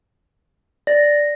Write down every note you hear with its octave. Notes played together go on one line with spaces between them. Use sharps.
D5 A#6